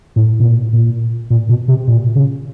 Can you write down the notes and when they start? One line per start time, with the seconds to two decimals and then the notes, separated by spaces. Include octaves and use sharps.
0.16 A2
0.40 B2
0.45 A#2
0.73 A#2
1.30 A#2
1.49 B2
1.68 C3
1.88 A#2
2.15 C#3